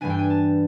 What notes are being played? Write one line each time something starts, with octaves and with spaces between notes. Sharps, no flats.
G2 E3 G3 B3 D4 G#5
G5
G#5
A5